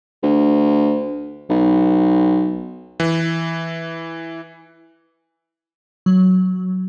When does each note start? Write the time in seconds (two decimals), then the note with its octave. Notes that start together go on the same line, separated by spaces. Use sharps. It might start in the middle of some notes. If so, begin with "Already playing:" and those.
0.23 D2
1.49 B1
3.00 E3
6.06 F#3